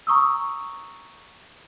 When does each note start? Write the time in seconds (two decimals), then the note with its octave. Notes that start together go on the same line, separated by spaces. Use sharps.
0.07 A#5 C#6 D#6 E6